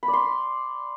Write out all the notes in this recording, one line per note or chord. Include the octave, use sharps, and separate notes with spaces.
B5
D5
C6